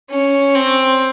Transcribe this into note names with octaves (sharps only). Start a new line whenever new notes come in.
C#4
C4